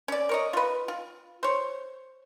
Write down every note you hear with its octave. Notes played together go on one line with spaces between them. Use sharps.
C#4 D5
A#4 C#5 D#5
F4 B4
F4
C5 C#5